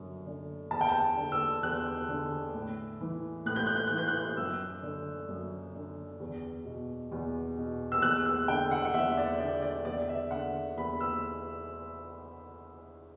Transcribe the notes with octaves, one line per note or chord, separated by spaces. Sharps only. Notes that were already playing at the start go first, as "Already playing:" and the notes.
Already playing: F#2 D3
D3
E2 A5
G5
A5
D3
E6
E2 F#6
D3
A2
E3
A2 F#6
G6
F#6
G6
E3 F#6
G6
F#6
F#2 E6
D3
F#2
D3
E2
B2
E2
B2
E6
E2 F#6
E6
D3 G5
F#5
F#5
E2 E5
D5
D3 D5
D5
E2 D5
E5
D3 F#5
E2 B5
E6